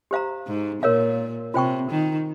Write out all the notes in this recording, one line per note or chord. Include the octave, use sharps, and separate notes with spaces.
G4 C5 F5 A#5
G#2
A#2 A#4 C#5 F5
C3 F4 C5 G5 C#6
D#3